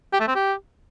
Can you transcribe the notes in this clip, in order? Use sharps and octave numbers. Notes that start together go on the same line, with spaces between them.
G4
A3
C4
G4